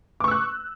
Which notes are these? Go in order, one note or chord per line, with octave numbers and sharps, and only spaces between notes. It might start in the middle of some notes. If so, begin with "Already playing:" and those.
C#6 D6 E6 F#6